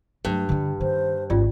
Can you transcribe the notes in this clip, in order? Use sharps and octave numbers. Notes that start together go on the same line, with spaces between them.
G2 F#3 A3
D3 D4
D#3 C#4 C5
G#1 C#4 F4 D5